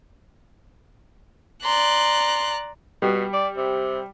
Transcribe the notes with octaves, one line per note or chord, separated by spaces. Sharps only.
D5 A#5 C6 F#6
B2 G3
D5
C3